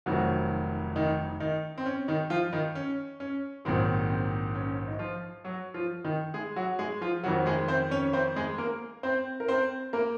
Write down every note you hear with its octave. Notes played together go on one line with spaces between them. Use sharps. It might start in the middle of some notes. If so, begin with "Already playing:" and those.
F1 F2 D#3 F#3 F#4
D#3 D#4
D#3 D#4
C4
C#4
D#3 D#4
F3 F4
D#3 D#4
C#4
C#4
A#1 G#2 D#3 F#3 C4
C4
C#4
D#4
F3 F4
F#3 F#4
F3 F4
D#3 D#4
G#3 G#4
F#3 F#4
G#3 G#4
F3 F4
F2 D#3 F#3 F#4
G#3 G#4
C4 C5
C#4 C#5
C4 C5
G#3 G#4
A#3 A#4
C4 C5
A#4
C4 C5
A#3 A#4